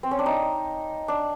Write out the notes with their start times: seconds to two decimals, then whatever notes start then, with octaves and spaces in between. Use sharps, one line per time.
0.03 C4
0.11 C#4
0.19 D4
0.26 D#4
1.08 D4